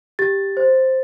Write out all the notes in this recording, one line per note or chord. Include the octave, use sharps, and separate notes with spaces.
G4 A6
C5